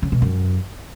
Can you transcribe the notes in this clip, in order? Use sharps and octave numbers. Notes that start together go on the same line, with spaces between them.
C#3
B2
F#2